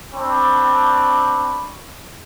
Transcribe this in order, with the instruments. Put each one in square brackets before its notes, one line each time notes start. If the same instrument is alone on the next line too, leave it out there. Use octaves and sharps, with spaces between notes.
[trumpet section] C4 D4 B5 C#6